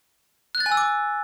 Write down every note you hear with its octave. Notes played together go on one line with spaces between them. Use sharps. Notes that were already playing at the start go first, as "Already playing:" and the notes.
F#6
A6
G#5
E6
D6